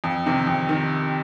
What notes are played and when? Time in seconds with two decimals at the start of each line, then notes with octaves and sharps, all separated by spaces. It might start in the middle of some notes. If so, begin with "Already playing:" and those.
0.04 F2
0.26 C3 D#3
0.47 F2
0.69 D#3